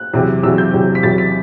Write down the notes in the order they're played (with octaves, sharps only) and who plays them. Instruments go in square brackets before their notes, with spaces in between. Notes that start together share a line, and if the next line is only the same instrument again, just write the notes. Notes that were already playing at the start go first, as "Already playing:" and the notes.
Already playing: [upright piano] F#6
E2 C3 F#3
E2 C3 F#3 E6
G6
E2 C3 F#3
B6
E2 C3 F#3 A6
B6